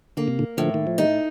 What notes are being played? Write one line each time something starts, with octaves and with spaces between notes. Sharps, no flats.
D3 A#3
C3
A#2 D3
A2 D3 F3
D#3
F3
D#3 G3 D#4